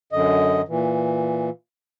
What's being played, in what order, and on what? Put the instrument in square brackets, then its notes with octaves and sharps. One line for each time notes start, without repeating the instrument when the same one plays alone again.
[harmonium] F#2 D3 D#5
A#2 E3